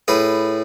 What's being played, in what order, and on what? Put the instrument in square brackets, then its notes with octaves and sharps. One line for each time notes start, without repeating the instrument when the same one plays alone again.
[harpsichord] A2 G#4 B4